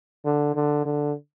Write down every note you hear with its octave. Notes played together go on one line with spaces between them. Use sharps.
D3
D3
D3